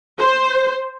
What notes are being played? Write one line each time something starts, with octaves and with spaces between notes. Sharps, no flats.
C5